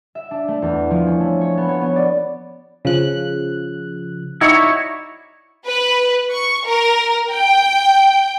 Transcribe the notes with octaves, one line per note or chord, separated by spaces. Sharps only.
E5
D4
A3
E2
F3
C#4
A3
C#5
B3
C#5
B3
D5
C#3 F3 F#6
D#4 E4 F#4 C#5 D5 B5
B4
C#6
A#4
G5